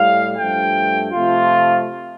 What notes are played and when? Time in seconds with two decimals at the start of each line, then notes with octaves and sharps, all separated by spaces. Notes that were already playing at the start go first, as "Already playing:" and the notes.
Already playing: A2 G3 F5
0.38 G2 F3 A3 G5
1.12 C3 F3 A3 F4